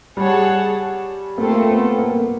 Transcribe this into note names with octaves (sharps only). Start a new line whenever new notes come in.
G3 G#4 C#5 F#5 A5
A3 A#3 C4 F4 A4
B3
A#3